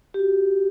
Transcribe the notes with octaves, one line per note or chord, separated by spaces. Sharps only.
G4
F#4